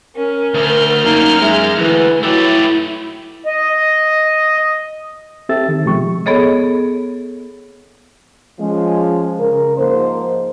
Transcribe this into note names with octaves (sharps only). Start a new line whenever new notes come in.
C#4 A#4
D2 F6 G6
F#2 A#3 D#4
G#3 E5
D2 E3 B4
F#3 A3 E4 G4
D#5
C4 G4 A4 E5 E6 A6
D#3
B2 F3 G#3 G4 C#6
B3 G#4 A4 C#5 D#5
F3 G#3 C#4
C#3 A#4
G#2 F3 A#3 A#4 C5